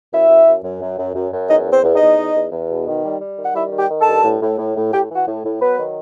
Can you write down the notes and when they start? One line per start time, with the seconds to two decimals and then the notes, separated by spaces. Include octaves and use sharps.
0.12 F#2 E4 E5
0.29 F#2
0.46 F#2
0.63 F#2
0.81 F#2
0.98 F#2
1.15 F#2
1.32 F#2
1.49 E2 D#4 D#5
1.66 E2
1.71 C4 C5
1.83 E2
1.95 D#4 D#5
2.01 E2
2.18 E2
2.34 E2
2.52 E2
2.70 B2
2.86 D#3
3.04 G3
3.20 G3
3.38 D#3
3.43 F#5
3.55 G3 E4 E5
3.72 D#3
3.77 G4 G5
3.90 D#3
4.01 A4 A5
4.07 G2
4.24 A2
4.41 A2
4.59 A2
4.76 A2
4.93 A2 G4 G5
5.09 E3
5.15 F#4 F#5
5.27 A2
5.44 A2
5.61 F#3 B3 B4
5.79 D#3